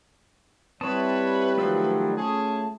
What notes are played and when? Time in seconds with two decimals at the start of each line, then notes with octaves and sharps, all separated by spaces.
0.81 G3 C4 E4 B4 C#5 A5 D#6
1.58 D#3 F3 F#3 A3 F4 E6
2.16 C#4 G#4 A5